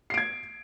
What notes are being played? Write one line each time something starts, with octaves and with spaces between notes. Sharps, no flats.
G#6 C7 D7